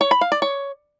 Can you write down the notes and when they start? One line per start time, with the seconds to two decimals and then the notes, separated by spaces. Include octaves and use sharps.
0.01 C#5
0.11 B5
0.21 F5
0.32 D5
0.42 C#5